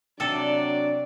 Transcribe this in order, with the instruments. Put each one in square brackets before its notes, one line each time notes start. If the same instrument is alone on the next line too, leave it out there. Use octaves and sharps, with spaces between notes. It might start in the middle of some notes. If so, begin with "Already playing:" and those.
[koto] C3 A4 [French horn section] F#3 C4 D4 [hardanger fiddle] D5